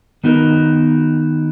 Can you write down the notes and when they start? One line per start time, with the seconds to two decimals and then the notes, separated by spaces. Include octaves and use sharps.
0.24 D#3 B3 D#4 F#4 A#4